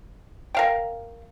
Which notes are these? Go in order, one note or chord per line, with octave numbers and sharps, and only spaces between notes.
A#4 F5 G5